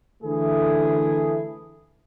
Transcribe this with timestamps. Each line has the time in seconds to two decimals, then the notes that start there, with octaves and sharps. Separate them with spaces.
0.23 D3 E3 A3 E4 G#4